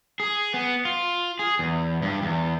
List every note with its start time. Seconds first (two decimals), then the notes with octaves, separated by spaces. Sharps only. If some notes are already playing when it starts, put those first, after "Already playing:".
0.20 G#4
0.54 B3
0.85 F4
1.39 G#4
1.59 E2
2.02 G2
2.22 E2